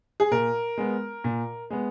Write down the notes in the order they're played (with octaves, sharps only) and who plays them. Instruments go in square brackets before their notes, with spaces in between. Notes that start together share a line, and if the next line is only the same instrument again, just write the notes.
[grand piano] G#4
A#2 A#4
G#3 B3
A#2
G#3 B3